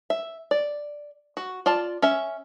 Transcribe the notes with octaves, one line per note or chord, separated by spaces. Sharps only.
E5
D5
F#4
F4 D5 A5
C#4 E5